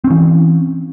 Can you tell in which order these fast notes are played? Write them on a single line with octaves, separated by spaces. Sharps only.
C4 C#4 E3